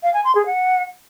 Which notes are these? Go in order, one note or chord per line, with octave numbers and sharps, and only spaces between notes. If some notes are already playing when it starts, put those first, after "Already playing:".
F5
G#5
C6
G#4
F#5